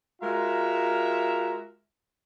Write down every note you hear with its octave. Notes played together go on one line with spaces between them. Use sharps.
G#3 F4 F#4 A#4 E5 A#5